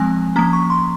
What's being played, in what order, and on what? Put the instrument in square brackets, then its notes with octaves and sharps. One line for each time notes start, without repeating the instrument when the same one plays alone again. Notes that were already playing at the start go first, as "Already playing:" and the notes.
Already playing: [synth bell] F3 G#3 C4 G#5
F3 A#3 C#4 A#5
C#6
C6